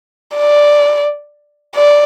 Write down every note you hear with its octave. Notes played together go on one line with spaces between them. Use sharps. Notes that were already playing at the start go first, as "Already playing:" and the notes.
D5
D5